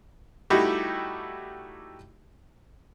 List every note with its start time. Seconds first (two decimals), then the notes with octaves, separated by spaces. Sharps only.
0.50 G3 A3 D#4 E4 F#4 G4